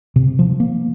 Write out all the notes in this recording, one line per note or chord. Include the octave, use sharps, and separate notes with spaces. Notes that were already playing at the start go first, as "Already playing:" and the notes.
C3
F3
A#3